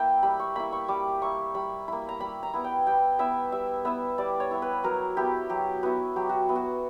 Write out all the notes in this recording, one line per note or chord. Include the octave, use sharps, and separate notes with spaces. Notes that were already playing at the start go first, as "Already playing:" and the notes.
Already playing: A#3 E4 E5 G5
G3 B5
C#6
A#3 E4 B5
C#6
G3 D6
A#3 E4 C#6
G3 B5
A#3 E4 B5
A#5
G3 B5
A#5
B3 E4
G5
G3 G5
B3 E4 E5
G3 E5
B3 E4 E5
G3 D5
C#5
B3 E4
B4
F#3 A#4
B3 E4 G4
F#3 G4
B3 E4 F#4
F#3 G4
F#4
B3 E4
F#4